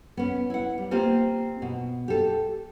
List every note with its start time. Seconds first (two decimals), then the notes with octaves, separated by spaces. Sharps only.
0.17 B3 C#4
0.50 E4 F#5
0.78 G3
0.91 A#3 C4 F4 G4
1.62 B2
2.08 G4 A4